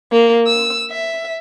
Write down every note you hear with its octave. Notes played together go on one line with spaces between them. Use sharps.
A#3
E6
E5